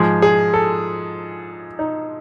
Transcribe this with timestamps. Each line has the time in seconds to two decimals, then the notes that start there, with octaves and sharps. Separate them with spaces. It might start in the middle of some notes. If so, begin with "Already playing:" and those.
Already playing: G#2 F3 G#3 G#4
0.22 G#4
0.54 A4
1.79 D#4